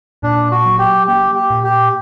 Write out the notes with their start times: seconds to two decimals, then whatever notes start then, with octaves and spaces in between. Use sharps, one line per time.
0.23 A#2 D4
0.51 F#4
0.66 F#3
0.79 G4
1.07 A#3 G4
1.35 G4
1.50 A#2
1.63 G4